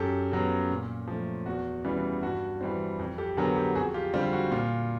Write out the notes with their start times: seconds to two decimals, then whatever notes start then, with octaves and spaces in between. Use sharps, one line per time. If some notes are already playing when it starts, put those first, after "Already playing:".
Already playing: F#2 G4 A4
0.32 C#3 F#3 B3
0.70 A#2
1.08 F3 A3
1.46 E2 F#4
1.84 C#3 E3 G3 B3
2.23 G2 F#4
2.61 E3 G3 C4
2.99 F2
3.18 G4 A4
3.37 D3 F#3 B3 G#4 A#4
3.56 G4 A4
3.75 F2 F#4 G#4
3.94 F4 G4
4.14 D3 G3 C4 F4 G4
4.33 F#4
4.52 A#2 F4